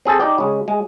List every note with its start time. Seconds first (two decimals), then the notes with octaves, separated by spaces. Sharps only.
0.05 C4 G#4 A4 A5
0.20 D#4 G4 D5 G5
0.38 C#3 G#3
0.68 G#3